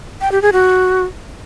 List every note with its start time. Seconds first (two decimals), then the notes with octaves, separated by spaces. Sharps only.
0.21 G5
0.32 G4
0.42 G#4
0.53 F#4